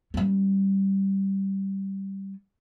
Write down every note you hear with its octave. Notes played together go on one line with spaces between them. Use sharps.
G3 C#4